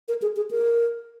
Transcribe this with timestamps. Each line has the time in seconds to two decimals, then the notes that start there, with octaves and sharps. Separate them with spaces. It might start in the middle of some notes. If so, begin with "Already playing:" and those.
0.08 A#4
0.22 G#4
0.36 G#4
0.51 A#4